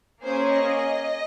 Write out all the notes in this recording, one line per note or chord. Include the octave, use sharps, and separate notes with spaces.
A#3 C#4 G#4 C5
D#5